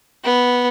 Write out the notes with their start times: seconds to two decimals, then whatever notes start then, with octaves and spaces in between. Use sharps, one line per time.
0.23 B3